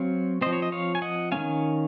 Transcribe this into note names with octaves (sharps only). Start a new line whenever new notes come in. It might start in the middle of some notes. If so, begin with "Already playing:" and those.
Already playing: F#3 C4 C#5 F5
F3 C4 C5 D#5
C#5
D#5
C#5 F5
G#5
D#5 F#5
D#3 A#3 C#4 F5 G#5